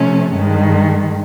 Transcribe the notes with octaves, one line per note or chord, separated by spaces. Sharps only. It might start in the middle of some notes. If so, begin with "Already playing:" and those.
Already playing: C3 F3 A3 C#4
G2 D#3 G#3